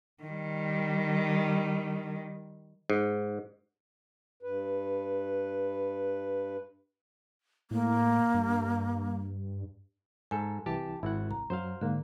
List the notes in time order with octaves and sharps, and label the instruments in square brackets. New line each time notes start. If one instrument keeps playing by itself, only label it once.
[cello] D#3 G3
[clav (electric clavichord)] G#2
[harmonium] G2 B4
[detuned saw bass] A2 [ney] A#3
[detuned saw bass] G2
[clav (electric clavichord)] G#2 A4 [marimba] G#5
[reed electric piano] C2 E3 A5 [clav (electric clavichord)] G4
[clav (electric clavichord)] G#1 F#5 [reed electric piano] E4
[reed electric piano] C2 [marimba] A#5
[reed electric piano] F#2 F#3 [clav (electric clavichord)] C5 F5
[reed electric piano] G#2 A#3 [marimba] D3